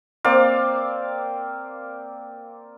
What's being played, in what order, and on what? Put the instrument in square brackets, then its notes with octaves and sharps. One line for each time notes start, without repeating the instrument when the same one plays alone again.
[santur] A#3 C4 D5 F5